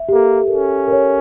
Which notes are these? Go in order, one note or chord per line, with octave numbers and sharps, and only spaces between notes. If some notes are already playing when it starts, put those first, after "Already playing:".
Already playing: E5
G4
A#3 A4
A#4
C#4 A4
A#4
C#5